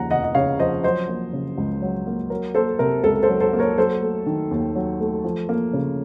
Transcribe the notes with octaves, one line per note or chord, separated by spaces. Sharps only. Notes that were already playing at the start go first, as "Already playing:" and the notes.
Already playing: D#2 C#3 F3 F#5 A#5
F1 D#5 F#5
D#5
C#3 C#5 F5
F3 C5 D#5
F#3 C5 D#5
A#3
C#3
C#2
F#3
A#3
F#3 A#4
A#3 A4 C5
C3 A#4
C#2 A4
A4 C5
F#3
A4 C5
A#3
A#4 C#5
F#3 A4 C5
A3
D#3
D#2
F#3
A3
F3
A#3
C#3